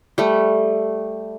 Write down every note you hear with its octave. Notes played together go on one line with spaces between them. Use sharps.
G3 A3